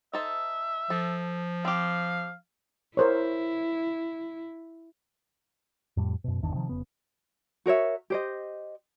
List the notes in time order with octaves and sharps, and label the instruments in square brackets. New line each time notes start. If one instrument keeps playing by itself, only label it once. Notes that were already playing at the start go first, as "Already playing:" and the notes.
[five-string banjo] D#4 A4 C5 [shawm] E5
[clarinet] F3 [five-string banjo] A4
[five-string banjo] C4 G4 [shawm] F5
[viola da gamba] E4 [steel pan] A#4 C5 C#5
[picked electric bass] F2 A2 G3
F#2 B2
G#1 E2 D#3 D4
C3 D#3 F3
F1 C#3 B3
[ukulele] F#4 A#4 C#5 E5
G4 C5 D#5